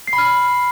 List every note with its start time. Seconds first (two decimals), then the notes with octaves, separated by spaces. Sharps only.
0.07 C7
0.13 B5
0.18 F6